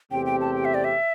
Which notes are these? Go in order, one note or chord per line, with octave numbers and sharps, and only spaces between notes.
E2 C3 A3 C4 G4 G5
G5
A5
G5
E5
D5
E5